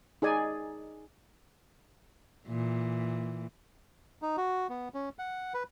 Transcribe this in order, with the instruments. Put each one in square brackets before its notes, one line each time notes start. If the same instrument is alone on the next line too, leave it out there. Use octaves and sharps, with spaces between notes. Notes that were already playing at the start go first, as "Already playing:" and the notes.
[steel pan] D#4 G#4 D5 G#5
[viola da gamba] A#2 E3
[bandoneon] D#4
F#4
B3
C#4
F#5
B4